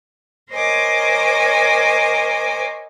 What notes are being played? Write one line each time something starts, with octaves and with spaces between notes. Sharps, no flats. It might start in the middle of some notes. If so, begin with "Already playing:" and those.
A#4 C5 C#5 D#5 G#5 D6